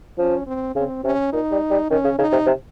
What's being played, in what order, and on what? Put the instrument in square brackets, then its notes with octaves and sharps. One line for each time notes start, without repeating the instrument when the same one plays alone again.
[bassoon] F3 [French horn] C#4
[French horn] C4
[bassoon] C#3 [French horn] C4
[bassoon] C3 [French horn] C#4
[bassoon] A#2 [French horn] D#4
[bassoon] G3
G3
[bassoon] D#3 [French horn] C#4
[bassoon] C#3
[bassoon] C#3 [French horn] D#4
[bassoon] C3
C3